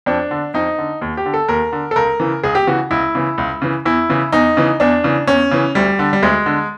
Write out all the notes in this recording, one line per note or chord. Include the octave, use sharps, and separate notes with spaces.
F2 D4
D3
F2 D#4
D3
D#2
G4
D3
A4
D#2 A#4
D3
A4
C#2 A#4
C#3 E3
C#2 G#4
G4
C#3 E3 F#4
C#2 E4
C#3 E3
C#2
C#3 E3
E2 E4
C#3 E3
E2 D#4
C#3 E3
E2 D4
C#3 E3
E2 C#4
C#3 E3
D2 G3
D3
G3
D2 G#3
D3